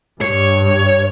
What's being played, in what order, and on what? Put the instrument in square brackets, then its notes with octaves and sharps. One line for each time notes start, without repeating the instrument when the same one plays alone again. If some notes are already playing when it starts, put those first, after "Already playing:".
[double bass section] G2 [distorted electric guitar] C#5